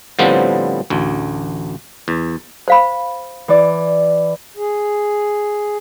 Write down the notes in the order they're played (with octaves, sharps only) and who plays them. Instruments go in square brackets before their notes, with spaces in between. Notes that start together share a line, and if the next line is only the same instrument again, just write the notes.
[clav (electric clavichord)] A2 D3 F3 G3 B3 C4
A1 D2
E2
[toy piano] C5 F5 B5
[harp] E3 D5
[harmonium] G#4